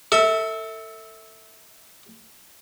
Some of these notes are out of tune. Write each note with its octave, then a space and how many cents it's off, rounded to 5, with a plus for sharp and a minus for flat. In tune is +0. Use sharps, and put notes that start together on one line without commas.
A4 +30 E5 -20